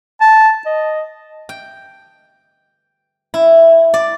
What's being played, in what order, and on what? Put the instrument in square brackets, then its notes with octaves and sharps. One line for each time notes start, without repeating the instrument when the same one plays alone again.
[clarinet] A5
D#5
[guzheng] G5
E4
D5